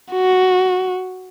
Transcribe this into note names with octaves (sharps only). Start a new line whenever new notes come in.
F#4